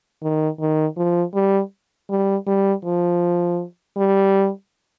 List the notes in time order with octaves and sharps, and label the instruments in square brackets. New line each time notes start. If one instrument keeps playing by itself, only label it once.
[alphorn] D#3
D#3
F3
G3
G3
G3
F3
G3